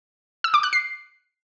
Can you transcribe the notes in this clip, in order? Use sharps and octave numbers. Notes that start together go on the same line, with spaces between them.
E6
D6
F#6
C7